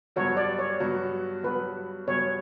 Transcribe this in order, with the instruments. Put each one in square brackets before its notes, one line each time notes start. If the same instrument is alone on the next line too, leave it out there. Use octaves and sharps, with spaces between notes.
[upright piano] G2 F#3 B3 F#4 [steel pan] C#5
[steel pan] D5
C#5
[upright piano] G2 F#3 B3 F#4
[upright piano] G2 F#3 B3 F#4 [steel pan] B4
[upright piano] G2 F#3 B3 F#4 [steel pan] C#5